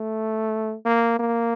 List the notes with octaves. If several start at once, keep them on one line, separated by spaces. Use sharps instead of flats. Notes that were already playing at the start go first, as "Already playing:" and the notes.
Already playing: A3
A#3
A#3